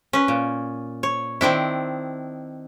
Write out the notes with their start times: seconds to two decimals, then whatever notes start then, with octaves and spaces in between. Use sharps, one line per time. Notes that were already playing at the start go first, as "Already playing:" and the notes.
0.13 C#4 B4
0.28 A#2
1.03 C#5
1.41 D#3 C4 D4 E4